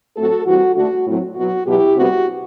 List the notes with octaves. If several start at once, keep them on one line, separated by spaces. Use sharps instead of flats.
A2 F#3 A3 C4 F#4 A4
G2 E3 G3 C4 F#4
D2 D3 A3 D4 F#4
A2 F#3 C4
B2 F#3 B3 F#4
E2 B2 F#3 E4 G4
D2 C3 G3 B3 F#4